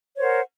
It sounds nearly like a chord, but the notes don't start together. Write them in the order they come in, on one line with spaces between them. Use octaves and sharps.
C#5 C5 A#4 F#5